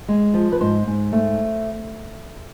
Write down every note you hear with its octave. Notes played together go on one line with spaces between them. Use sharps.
G#3
F3
B4
G#2 C5
G#2
A3